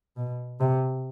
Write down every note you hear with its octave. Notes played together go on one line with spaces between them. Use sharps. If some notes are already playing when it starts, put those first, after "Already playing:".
B2
C3